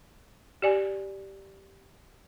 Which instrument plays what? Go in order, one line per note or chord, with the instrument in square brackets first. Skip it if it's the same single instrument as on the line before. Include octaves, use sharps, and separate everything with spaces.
[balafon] G4 D5 G#5